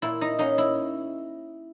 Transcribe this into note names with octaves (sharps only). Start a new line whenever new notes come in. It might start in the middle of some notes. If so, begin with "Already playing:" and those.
A#2 E4
D#4
A#3 C#4 D#4
E4